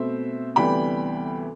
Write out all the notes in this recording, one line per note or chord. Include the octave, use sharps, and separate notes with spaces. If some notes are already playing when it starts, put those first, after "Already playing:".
Already playing: B2 A3 C4 C5 E5
D2 C3 E3 G3 B3 G5 B5